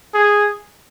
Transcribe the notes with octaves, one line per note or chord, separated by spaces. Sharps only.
G#4